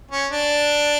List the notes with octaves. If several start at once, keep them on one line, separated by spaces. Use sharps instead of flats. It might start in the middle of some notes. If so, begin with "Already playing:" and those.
C#4
D4